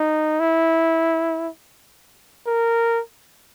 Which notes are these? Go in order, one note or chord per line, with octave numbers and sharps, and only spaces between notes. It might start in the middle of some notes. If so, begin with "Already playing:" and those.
Already playing: D#4
E4
A#4